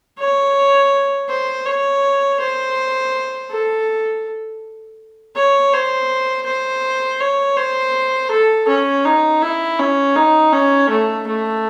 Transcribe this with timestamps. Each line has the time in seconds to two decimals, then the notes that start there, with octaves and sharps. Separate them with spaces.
0.19 C#5
1.29 C5
1.66 C#5
2.40 C5
3.51 A4
5.36 C#5
5.73 C5
6.46 C5
7.21 C#5
7.57 C5
8.31 A4
8.68 C#4
9.05 D#4
9.42 E4
9.79 C#4
10.16 D#4
10.53 C#4
10.90 A3
11.27 A3